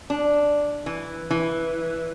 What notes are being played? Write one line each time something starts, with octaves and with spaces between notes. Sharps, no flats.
D4
E3
E3